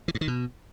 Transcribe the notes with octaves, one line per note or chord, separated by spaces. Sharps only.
E3
G2
D#3
B2